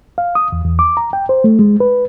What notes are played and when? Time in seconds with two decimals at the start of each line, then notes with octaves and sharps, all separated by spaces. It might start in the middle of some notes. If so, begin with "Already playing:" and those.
0.18 F5
0.35 D#6
0.52 E2
0.64 E2
0.79 D6
0.97 A#5
1.13 G5
1.29 C5
1.44 A3
1.59 G#3
1.80 B4